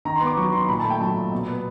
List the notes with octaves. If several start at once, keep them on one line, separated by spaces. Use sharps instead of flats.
D#3 A#5
C6
B3
D6
F#3 C#6
D#3 C6
A#2 B5
A5
A3
G5
F#3 A5
A#2
B2
B3